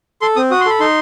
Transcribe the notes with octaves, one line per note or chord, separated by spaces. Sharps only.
A4 C6
C4 D#6
F#4 D#6
C6
A4 B5
D#4 C6